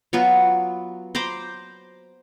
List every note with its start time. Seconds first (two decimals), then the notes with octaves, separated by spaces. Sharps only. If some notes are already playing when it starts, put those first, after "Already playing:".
0.13 F#3 B3 F4 F#4
1.15 C5 A#5 B5 D6